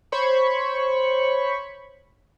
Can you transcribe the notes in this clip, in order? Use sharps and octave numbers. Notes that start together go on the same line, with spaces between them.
C5 C#5 B5 C#6